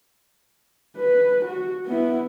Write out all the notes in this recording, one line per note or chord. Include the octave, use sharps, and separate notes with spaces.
B4
F#4
B3 E4